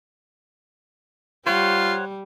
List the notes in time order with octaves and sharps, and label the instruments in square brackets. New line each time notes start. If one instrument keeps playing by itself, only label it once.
[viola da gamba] G3 [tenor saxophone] F4 [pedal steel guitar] C5 C#5 F#5